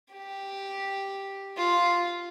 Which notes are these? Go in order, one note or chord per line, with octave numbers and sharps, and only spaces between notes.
G4
F4